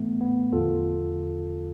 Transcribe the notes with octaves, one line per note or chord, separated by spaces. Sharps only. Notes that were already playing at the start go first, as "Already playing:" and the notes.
Already playing: A2 E3 A3 B3
B3
E2 D3 F3 F4 A4